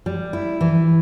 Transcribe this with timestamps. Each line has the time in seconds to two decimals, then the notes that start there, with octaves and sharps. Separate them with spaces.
0.06 G3
0.33 E4
0.61 E3